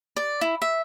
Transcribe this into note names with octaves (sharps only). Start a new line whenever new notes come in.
D5
E4
E5